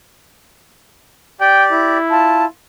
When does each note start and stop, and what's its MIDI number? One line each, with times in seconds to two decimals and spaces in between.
1.41 1.98 67
1.41 1.98 74
1.41 1.65 79
1.72 2.46 64
2.10 2.46 65
2.10 2.45 81